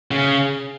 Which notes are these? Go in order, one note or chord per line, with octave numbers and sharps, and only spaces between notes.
C#3